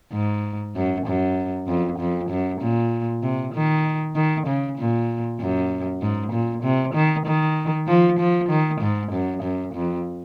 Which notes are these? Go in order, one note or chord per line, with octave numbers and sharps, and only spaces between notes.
G#2
F#2
F#2
F2
F2
F#2
A#2
C3
D#3
D#3
C#3
A#2
F#2
G#2
A#2
C3
D#3
D#3
F3
F3
D#3
G#2
F#2
F#2
F2